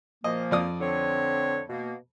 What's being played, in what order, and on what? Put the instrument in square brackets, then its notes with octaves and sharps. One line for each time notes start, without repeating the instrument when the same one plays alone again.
[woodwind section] A#2 F3 A#3 [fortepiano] D#5
[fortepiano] F2 D5 D#6
[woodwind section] D3 C4 C#5
B2 A#3